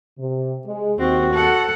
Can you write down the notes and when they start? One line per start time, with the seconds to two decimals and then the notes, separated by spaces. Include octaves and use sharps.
0.19 C3
0.66 G#3
0.99 D#2 C4 F#4
1.35 A4 F#5